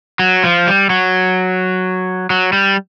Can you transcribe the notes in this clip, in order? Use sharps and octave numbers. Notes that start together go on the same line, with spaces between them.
F#3
F3
G3
F#3
F#3
G3